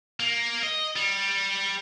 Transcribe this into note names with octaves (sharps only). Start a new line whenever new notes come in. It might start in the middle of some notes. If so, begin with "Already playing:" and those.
A#3
D#5
G3